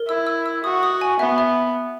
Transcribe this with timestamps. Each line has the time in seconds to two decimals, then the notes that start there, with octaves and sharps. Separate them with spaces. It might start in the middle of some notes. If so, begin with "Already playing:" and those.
Already playing: A#4
0.08 E4 E6
0.27 E6
0.46 E6
0.64 F#4 D#6
0.83 D#6
1.01 G#5
1.19 B3 E5
1.38 E5